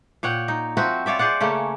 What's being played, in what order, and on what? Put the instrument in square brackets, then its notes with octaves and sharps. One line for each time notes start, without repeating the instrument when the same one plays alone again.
[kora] A#2 C#5 F#5 G5
D#4
F3 C4 F#4 E5
F4 C#5 D5 E5
G#4 C5 D5 F#5
C#3 A3 A#3 C#4